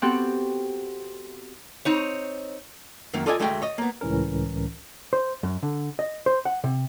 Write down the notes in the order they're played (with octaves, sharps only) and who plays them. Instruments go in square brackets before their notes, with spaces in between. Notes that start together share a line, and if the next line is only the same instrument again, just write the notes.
[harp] B3 C4 F#4 G4 A4 F#5
[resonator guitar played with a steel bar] C4 D#4 C#5
[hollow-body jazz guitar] F#2 D#3 A#3
F4 A4 D5 D#5 F#5 G#5
D2 G#3 A3 F#4 G5
C#5 D#5
A#3 B3
[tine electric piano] C#2 A2 E3 C#4 A#4
[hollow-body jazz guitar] C5
F#2
D3
D#5
C5
F#5
C3